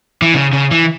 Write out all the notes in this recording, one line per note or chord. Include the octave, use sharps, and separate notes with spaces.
E3
C#3
C#3
E3